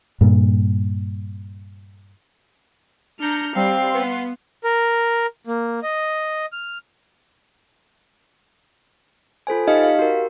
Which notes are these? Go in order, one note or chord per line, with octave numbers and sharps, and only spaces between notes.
G2 A#2
D4 A#5 F6 G6 C#7
G3 C4 F5 C6
B3
A#4
A#3
D#5
F6
F4 A4 C5 G#5
D#4 G4 D#5 F5
G4 F5
F#4 A#4